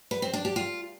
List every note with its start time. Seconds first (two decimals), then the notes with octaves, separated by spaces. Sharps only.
0.11 B4
0.22 C4
0.33 D4
0.45 G4
0.56 F4